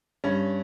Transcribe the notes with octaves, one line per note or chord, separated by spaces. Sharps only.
G2 C#4